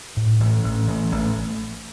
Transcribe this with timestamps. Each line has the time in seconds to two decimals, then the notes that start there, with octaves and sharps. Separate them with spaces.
0.17 A2
0.40 A1
0.64 A1
0.88 A1
1.12 A1